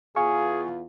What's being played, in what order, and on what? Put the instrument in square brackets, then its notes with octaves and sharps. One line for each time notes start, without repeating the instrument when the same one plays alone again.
[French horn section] E2 B3 F4 [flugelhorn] G#4 [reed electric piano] F5 G#5 C#6